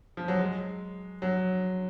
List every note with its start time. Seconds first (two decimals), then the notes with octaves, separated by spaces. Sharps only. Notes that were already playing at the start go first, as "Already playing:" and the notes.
0.17 F3
0.28 F#3
0.39 G#3
1.22 F#3